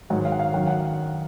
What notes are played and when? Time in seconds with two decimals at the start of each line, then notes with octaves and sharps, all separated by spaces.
0.10 G#2 D#3 F#3 F#5
0.25 F5
0.32 F#5
0.40 F5
0.53 F#2 D#3 F#3 F#5
0.67 F#5